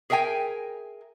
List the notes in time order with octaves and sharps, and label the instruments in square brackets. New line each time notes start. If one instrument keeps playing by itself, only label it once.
[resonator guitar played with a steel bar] G#4 A#4 E5 G5 G#5